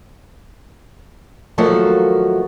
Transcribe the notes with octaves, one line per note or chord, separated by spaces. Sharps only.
D#2 F3 F#3 A3 A#3 F#4